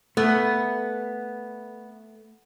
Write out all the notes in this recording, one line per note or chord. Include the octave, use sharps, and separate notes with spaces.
A3 B3